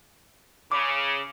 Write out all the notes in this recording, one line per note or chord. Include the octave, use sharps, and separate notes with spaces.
C#3 D6